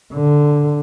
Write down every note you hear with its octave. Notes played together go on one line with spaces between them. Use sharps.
D3